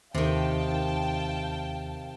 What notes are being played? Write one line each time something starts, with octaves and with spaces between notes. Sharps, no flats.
D#2 C3 D#3 F5 G5 A5